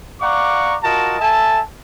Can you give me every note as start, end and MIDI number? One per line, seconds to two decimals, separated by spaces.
0.21 0.77 74
0.21 0.77 77
0.21 0.77 78
0.21 0.77 82
0.21 0.77 85
0.21 0.77 86
0.83 1.19 65
0.83 1.19 66
0.83 1.19 70
0.83 1.19 75
0.83 1.19 81
1.20 1.60 69
1.20 1.60 76
1.20 1.60 80
1.20 1.60 81